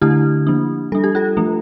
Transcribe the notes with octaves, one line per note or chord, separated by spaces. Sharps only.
D3 A3 D4 E4 G4
F3 A#3 D4
G3 D4 A4
G4
F4 A4
F3 A3 D4